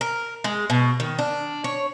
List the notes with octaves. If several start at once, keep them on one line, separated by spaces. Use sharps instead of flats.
A#4
G#3
B2
D#3
D4
C#5